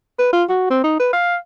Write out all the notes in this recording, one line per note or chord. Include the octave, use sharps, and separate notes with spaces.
B4
F4
F#4
C4
D#4
B4
F5